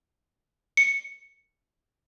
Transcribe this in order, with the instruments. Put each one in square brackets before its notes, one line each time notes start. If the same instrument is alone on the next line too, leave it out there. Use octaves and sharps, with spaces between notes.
[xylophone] C#7